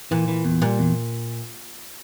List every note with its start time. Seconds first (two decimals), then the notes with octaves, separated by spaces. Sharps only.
0.11 A#2 E3
0.28 E3
0.44 E2
0.62 A#2 G3
0.79 E2